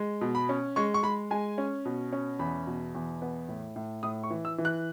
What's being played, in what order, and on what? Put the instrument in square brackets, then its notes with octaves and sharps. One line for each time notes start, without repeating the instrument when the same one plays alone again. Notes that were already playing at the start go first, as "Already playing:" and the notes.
Already playing: [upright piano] G#3
B2
B5
C#4
G#3 C#6
C#6
G#3 B5
G#3 G#5
C#4
B2
C#4
E2 B5
B2
E2
B3
A2
A2
A2 D#6
C#6
E3
E6
E3
F#6